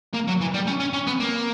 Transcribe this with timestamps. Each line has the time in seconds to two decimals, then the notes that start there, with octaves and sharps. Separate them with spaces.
0.14 A#3
0.27 F#3
0.41 E3
0.54 G3
0.67 C#4
0.80 C#4
0.93 C#4
1.07 B3
1.20 A#3